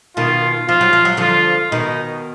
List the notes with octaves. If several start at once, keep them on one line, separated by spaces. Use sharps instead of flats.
B2 D#3 F4
F3 F4
F#3
F3
F#3
D3 F3 F4
B2 D#3 D#4